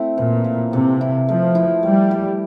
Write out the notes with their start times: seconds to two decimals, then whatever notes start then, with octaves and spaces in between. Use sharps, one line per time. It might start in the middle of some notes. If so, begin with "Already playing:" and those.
Already playing: A3 C4 E4
0.18 A#2 E3
0.44 A#3
0.72 C3 A4
1.01 E4
1.28 F3 A3
1.55 E4
1.83 G3 A3
2.11 G4